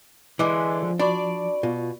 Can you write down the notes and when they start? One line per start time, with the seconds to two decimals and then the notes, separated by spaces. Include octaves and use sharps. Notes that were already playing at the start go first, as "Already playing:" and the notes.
0.39 D3 E3 G#3 A3 D#5 D6
0.83 F3
0.99 D4 F#4 D5 B5 C#6
1.63 B2 F4